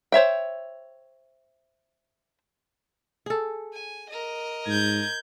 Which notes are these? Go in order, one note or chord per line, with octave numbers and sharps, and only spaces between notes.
C5 C#5 E5 G5
G#4 A4
G#5
A#4 D#5
G#2 G6 G#6